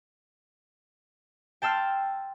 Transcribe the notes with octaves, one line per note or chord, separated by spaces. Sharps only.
G5 A5 C6 E6 F6